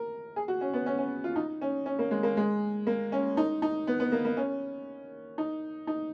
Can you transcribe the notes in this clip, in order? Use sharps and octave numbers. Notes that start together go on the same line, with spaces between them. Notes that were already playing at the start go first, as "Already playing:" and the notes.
Already playing: A#4
G#4
F#4
C#4
B3
C#4
C#4
F4
D#4
C#4
C#4
A#3
G#3
A#3
G#3
A#3
C#4
D#4
D#4
B3
B3
A#3
A#3
C#4
D#4
D#4